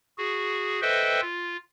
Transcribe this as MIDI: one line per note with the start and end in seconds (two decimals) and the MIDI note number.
0.18 0.80 66
0.18 0.80 68
0.82 1.21 69
0.82 1.21 71
0.82 1.21 72
0.82 1.21 75
0.82 1.21 76
0.82 1.21 79
1.21 1.57 65